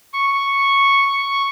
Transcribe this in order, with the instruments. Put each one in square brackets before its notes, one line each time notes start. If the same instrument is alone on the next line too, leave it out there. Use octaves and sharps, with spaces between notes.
[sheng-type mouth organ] C#6